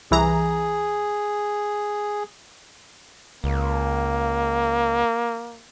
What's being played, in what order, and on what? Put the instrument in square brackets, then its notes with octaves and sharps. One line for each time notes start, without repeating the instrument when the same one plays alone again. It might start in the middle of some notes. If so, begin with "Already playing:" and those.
[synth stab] C2 E3 A#5 [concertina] G#4
[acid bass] C#2 [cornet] A#3